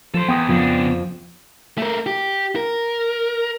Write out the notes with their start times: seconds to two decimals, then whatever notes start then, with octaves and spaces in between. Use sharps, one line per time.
0.14 F3 A4 C5
0.28 E2 B3 G5 D#6 A#6
0.49 F2 C#3 D4
1.78 A3 A#4
2.06 G4
2.56 A#4